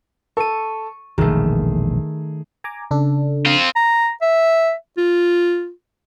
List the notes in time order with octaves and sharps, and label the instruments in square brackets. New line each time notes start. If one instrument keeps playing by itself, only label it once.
[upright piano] A4 [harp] C#6 D#7
[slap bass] E1 A#1 [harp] D#3 A3 [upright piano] G#4
[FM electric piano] G#5 A#5 D6
C#3 D4 A4
[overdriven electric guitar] C4 F4
[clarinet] A#5
E5
F4